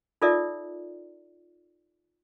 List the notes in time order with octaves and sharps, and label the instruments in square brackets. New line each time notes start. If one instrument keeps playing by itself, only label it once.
[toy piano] D#4 F4 A4 A#4 D5 E5